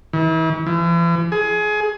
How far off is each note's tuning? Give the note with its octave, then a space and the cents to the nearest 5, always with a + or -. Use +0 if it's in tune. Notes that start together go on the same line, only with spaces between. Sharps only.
E3 -40
E3 +45
G#4 +25